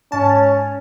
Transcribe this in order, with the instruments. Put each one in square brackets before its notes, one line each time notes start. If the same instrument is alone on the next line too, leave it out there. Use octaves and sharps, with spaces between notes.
[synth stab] G#2 A5 [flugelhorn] C#4